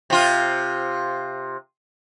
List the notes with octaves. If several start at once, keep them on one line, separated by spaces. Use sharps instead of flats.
C3 F4